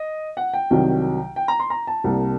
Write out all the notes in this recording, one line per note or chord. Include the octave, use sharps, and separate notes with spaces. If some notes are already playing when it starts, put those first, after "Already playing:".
Already playing: D#5
F#5
G5
C2 C3 D#3 F#3
G5
A#5
C6
A#5
A5
C2 C3 G3 A#3